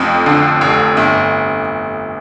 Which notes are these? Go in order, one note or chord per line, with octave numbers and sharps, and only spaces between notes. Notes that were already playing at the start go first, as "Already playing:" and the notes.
Already playing: F1 F2
D3
F1
G1